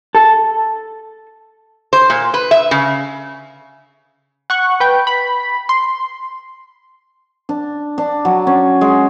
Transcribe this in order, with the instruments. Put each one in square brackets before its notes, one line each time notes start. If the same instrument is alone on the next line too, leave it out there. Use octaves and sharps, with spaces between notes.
[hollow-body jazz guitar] A4
[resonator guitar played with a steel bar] C5
A#2
B4
E5
C#3
[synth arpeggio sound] F#5 C#6 F#6
B4 G5
B5
C6
[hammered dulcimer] D4
D4
F#3
C#4
G#3